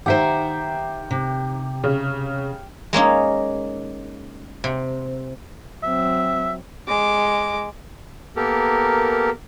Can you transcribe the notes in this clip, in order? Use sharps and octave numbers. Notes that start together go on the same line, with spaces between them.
D#3 G4 C5 E5 F#5 G5 A#5
C3
C#3
G#3 A#3 C#4 D#4
C3
F#3 C4 E5
G#3 D6
A#3 B3 G4 A4 A#4